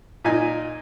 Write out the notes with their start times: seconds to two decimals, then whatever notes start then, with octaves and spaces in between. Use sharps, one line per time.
0.25 A#2 D#4 G#5